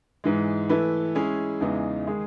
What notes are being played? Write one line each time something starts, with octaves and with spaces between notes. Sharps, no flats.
G#2 E3 G#3
E3 A3 E4 B4
G#3 C#4 E4 G#4
E2 C#3 E3 G#3 D#4
D#3 G#3 D#4 G#4